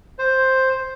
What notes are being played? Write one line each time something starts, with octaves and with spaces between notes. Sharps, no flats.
C5